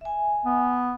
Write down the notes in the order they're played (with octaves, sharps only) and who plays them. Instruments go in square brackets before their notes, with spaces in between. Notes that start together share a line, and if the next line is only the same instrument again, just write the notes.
[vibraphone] E5 G#5
[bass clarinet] B3